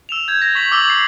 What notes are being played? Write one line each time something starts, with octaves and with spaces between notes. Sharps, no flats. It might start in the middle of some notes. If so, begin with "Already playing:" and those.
E6 E7 F7
G6 G#6
A#6
C#6 B6 F#7
D6 E6 A6 F#7 G7
C7